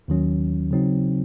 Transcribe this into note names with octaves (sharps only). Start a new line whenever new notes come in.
D#2 D#3 F#3 C#4
C#3 F#3 C4 D#4